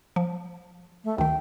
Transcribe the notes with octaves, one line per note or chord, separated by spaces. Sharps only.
F3
A3
D2 D#3 G5